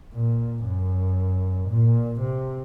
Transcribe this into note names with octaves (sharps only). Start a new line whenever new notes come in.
A#2
F#2
A#2
C3